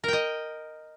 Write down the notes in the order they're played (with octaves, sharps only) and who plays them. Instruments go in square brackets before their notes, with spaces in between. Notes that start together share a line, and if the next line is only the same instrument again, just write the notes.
[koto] A#4
G5
D#5